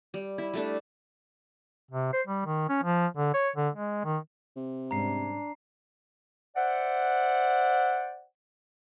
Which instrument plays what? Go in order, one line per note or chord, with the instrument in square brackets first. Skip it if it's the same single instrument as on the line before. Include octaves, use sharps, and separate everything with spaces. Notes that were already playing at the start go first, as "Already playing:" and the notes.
[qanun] G3
E4
G3 A3 D4
[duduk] C3
C5
G3
D#3
C#4
F3
D3
C#5
D3
G#3
D#3
[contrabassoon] C3
[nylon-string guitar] G#2 G3 C#4 [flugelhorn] D4 [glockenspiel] A#5 C7
[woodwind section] C5 D5 E5 F#5